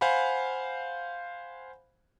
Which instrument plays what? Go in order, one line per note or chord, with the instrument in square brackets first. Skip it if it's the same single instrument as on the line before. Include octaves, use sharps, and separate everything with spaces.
[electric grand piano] C5 F5 F#5 G#5 B5